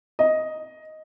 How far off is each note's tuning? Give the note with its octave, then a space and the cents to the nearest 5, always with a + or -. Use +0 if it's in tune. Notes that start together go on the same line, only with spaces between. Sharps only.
D#5 +5